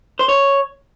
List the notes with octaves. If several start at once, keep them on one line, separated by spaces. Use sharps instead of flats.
C5
C#5